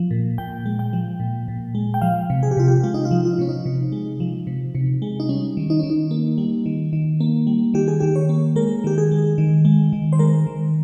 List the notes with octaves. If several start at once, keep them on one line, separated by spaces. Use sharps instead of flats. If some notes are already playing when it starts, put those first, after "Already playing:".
Already playing: F3
A#2
A#2 G5
G#3
G5
F3
A#2
A#2
G#3
G5
F3 F5
C3
G#4
G4
C3 F4
G4
G#3 F4
D#4
F4
F3
F4
D#4
C3 C#4
D#4
C3
G#3
F3
C3
C3
G#3
D#4
G3 C#4
D#3
D#4
D#3 C#4
D#4
A#3
G3
D#3
D#3
A#3
G3
D#3 G4
G#4
D#3 G4
C#5
A#3
G#3 A#4
D#3 G4
G#4
G#3
D#3
G#3
D#3
C5
G#3 A#4
D#3